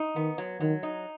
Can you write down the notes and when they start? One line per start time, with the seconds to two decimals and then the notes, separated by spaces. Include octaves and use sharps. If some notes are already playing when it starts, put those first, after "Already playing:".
Already playing: D#4
0.16 D#3 B3
0.38 F#3
0.60 D#3 F#3
0.83 D#4